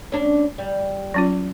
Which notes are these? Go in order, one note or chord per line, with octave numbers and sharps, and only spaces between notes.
C#4 D4
G3
F#3 C#4 F4